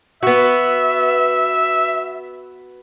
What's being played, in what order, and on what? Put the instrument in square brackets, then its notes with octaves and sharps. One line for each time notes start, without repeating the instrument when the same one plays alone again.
[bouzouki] B3 F#4 [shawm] E5